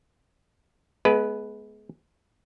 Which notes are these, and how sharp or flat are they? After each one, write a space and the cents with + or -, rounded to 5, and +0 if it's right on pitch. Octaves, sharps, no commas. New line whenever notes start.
G#3 +30 B3 +0 B4 +0